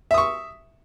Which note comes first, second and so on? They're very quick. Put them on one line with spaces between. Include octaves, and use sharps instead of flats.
E5 D#6 C#6